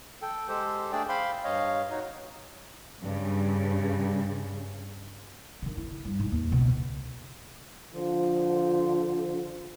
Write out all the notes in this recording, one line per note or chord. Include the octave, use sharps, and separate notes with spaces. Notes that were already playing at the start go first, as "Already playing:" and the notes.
A4 G5
G#3 G4 A4 C5
A3 D4 G#4 D5 G5
C5 F5 G5 B5 C6
G2 C#5 D#5 F5
D#4 F#4 C#5
G2 C#3
D3 D#3
E4
G2
G#2 G#3
D#2
C#2 B2
D3 F3 F4 C5